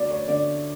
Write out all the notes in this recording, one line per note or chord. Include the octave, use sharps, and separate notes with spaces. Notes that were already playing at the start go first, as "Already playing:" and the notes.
Already playing: D2 D5
C#5
D3 A3 D5